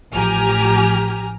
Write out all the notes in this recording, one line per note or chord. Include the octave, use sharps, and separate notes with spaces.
A1 F3 G4 G#5 A#5 F6